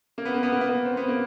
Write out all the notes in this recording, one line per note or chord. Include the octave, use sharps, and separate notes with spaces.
A#3
B3
A#3
B3
A#3
B3
A#3
C4
B3
A#3